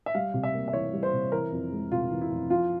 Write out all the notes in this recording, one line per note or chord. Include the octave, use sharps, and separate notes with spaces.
E5
G3 F5
C3
E5
A#3
E5
E3 C#5
G3
C5
C3
E3 A#4
F2
G#3
C3 F4
E3
E4
F2
F3 F4